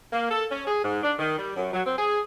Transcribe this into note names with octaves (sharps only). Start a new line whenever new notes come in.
A#3
A4
C#4
G#4
G#2
D4
D#3
G3
F#2
F#3
C4
G#4